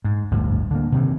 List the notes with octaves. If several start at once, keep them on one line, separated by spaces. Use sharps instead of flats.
G#2
G1 D2 A2
D3 A#3
C3 D#3 E3